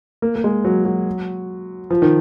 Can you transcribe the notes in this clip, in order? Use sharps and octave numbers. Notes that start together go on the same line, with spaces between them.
A#3
A#3
G#3
F#3
F#3
F3
D#3